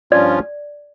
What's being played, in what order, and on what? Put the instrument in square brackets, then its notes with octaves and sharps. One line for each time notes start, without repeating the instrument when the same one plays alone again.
[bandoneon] G2 F3 C#4 F4 [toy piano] D5